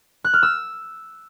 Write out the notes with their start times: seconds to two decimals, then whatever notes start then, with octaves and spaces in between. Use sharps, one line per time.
0.24 F#6
0.34 F6
0.43 E6